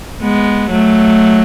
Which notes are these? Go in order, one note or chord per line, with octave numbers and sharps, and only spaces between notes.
G#3 B3
F#3 A3